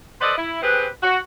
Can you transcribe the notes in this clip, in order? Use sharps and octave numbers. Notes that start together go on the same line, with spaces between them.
A4 B4 C5 D5 D#5
E4
C4 G4 G#4 B4
F#4